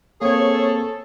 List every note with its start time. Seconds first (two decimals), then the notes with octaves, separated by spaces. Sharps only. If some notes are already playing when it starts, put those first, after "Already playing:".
0.22 A#3 C4 G#4 A4 C#5